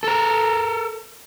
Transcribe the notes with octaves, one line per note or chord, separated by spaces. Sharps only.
A4 A#4